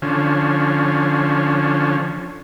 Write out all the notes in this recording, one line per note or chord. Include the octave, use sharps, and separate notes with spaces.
D3 F3 C#4